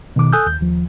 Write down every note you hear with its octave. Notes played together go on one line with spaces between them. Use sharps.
B2 D#3 D6
A4 G#5 D#6 E6 F#6 G6
D#2 G6
D#2 F3